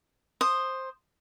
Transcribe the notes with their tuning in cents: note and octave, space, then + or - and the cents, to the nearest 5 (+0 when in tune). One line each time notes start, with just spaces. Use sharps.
C5 +10 D#6 -10